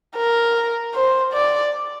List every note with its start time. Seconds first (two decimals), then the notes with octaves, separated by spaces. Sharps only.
0.16 A#4
0.94 C5
1.33 D5